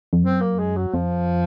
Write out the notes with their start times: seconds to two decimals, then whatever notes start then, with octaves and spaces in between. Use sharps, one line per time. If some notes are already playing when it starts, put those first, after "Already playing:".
0.13 F2
0.23 F#2 C4
0.41 A#3
0.59 G#3
0.76 F#3
0.93 F2 F3